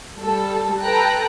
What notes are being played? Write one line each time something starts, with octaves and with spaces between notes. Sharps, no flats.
G3 A4
A4 B4 G5 A#5 F#6